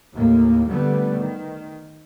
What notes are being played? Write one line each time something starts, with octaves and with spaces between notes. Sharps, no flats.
D#2 A2 A#3
D3 G3 A3 B3
D#3